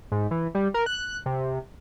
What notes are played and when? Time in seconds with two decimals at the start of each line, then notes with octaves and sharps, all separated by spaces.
0.12 G#2
0.31 E3
0.55 G3
0.74 A#4
0.86 F#6
1.26 C3